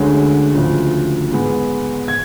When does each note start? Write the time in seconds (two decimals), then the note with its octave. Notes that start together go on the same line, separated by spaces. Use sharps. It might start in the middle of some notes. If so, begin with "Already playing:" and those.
Already playing: D2 D3 G#3 C#4
0.54 D2 C#3 F3
1.31 G#2 G#3 B3
2.08 G#6